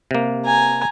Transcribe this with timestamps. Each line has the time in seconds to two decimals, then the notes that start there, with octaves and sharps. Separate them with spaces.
0.11 C3 A#3
0.45 G#5 A#5